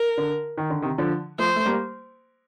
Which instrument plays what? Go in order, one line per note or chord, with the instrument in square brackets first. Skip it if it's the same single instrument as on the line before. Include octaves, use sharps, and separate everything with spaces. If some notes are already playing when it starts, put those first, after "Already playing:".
Already playing: [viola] A#4
[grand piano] D3
D#3
D3
C3 D#3
D3 F3
[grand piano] F3 A3 [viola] C5
[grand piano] A3
G3 A#3